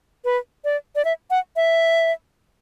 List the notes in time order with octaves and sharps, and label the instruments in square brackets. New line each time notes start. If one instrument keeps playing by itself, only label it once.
[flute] B4
D5
D5
E5
F#5
E5